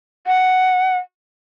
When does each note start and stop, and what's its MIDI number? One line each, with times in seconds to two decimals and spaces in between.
0.27 0.97 78